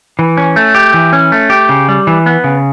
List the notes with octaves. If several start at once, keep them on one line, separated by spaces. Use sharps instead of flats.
E3
C#4
A3
G4
E3
C#4
A3
G4
C#3
G3
E3
B3
C#3